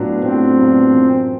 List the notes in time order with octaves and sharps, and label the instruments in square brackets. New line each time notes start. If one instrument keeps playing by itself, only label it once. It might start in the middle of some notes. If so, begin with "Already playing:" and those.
Already playing: [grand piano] A2 F#3 B3 D4 F4
[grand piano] A2 [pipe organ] C4
[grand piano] F#3 B3 D4 F4
F#2